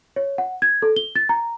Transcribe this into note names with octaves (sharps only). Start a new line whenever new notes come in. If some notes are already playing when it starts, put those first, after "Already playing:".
C#5
F#5
G#6
A4
G7
A6
A#5